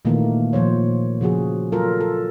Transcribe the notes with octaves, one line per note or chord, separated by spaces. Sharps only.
A#2 D#3 E3 A3 A#3
A#2 F3 C5 C#5
C#3 F3 F#4 G#4
F#3 F4 A4 A#4
A4